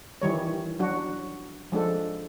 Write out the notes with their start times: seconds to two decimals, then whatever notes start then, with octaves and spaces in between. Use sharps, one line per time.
0.22 D#3 E3 G3 C#5
0.80 F#3 D4 F#4
1.72 F3 G#3 D4 A4